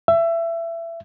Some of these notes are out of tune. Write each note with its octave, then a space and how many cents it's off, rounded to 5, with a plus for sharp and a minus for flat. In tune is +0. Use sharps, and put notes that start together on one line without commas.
E5 +25